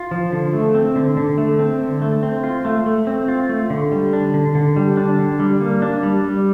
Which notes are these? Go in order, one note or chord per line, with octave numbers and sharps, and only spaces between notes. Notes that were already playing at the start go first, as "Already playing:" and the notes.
Already playing: F4
F3
D3
A3
C4
D3
D3
A3
C4
D3
A3
C4
F4
A3
A3
C4
F4
A3
D3
G3
D4
D3
D3
G3
D4
D3
G3
A#3
D4
G3
G3